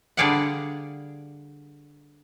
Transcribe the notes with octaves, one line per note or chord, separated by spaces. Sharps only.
D3 G3 G#4 D5 F5 F#5